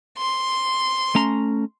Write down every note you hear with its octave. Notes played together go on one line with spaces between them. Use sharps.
C6
A3 C#4 A#5